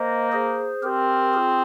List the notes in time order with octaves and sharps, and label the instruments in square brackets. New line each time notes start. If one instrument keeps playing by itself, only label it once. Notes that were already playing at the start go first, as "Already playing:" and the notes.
Already playing: [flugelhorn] A#3 [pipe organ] C5 D#5
[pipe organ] G#4 C5
[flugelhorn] C4 [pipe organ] G4 A#4
[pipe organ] F4 G#4